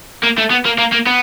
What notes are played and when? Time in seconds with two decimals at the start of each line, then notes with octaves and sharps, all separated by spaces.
0.24 A#3
0.38 A3
0.51 B3
0.65 A#3
0.79 A#3
0.92 A#3
1.06 B3